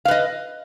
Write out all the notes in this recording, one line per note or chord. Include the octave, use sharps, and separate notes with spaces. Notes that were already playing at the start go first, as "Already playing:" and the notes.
B4 D#5 F5